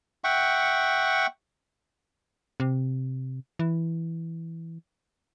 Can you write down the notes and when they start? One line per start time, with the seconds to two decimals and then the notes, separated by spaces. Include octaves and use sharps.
0.24 E5 F#5 G5 C#6
2.60 C3
3.59 E3